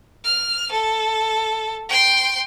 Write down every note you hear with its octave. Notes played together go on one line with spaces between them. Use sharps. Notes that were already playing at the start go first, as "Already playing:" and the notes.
F6
A4
G5 C6